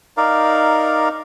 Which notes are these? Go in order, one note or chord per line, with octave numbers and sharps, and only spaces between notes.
D#4 A#4 D5 F5